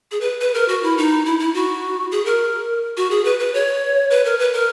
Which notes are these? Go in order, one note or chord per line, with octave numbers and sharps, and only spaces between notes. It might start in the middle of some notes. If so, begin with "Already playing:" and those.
G#4
B4
B4
A#4
F#4
E4
D#4
E4
E4
F#4
G#4
A#4
F#4
G#4
B4
B4
C#5
B4
A#4
B4
A#4